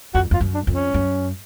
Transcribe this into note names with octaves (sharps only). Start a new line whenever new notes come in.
F2 F#4
F2 F4
F#2
D4
F2
C#4
F#2